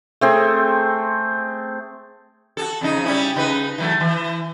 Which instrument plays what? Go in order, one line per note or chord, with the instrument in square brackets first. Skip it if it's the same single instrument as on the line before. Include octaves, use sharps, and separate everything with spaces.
[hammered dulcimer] A3 C4 G#4
[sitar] F#4 G#4 A4
F2 C#3 D#4
G3 C#4 E4
C#3 D#4 B4
E3 F#3 A3
E3